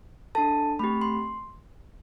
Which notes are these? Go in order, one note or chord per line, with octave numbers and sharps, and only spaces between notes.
D4 A4 A5
A3 C4 G4 B5
C6